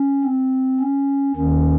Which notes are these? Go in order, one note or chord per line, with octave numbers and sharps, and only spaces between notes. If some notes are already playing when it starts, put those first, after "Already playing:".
Already playing: C#4
C4
C#4
D#2 D#3 C#4